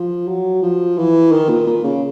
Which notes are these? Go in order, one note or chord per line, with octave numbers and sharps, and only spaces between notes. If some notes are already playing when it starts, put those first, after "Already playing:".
Already playing: F3
F#3
F3
E3
D#3
A#2
A#2
C#3